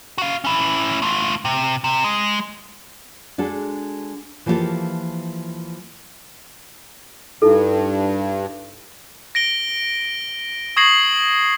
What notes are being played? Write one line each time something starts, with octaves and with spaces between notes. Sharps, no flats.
F#4 F5
C#4 E4
A3 F4
C3
C3
G#3
G#3 D4 F#4 A4
E3 F3 A#3 B3 G4 A4
G2 D#4 E4 A4
A#6 D7 G7
C#6 D#6 G#6 A#6 C7 F#7